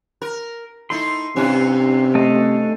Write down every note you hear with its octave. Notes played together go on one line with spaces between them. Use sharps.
A#4
A3 D#4 E4 C6
G2 C3 C#4 E4
A3 A4 D#5